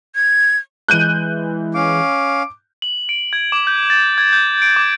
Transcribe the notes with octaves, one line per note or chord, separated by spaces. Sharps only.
G#6
E3 G#3 F#6 G6 D#7
C#4 F5 D6
F#7
D7
G#6
D6
G6
A6
G#6
G6
D7
D6